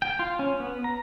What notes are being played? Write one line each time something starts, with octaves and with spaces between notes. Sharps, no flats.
G5
F4
C#4
B3
A#5